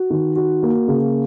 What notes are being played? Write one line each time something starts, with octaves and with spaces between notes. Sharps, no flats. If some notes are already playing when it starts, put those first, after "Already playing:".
Already playing: F#4
D#3
F#4
A#3
C#3